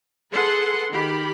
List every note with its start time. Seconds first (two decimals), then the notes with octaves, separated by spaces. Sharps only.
0.31 G#4 A4 B4 F#5 C6
0.91 D#3 G4 B5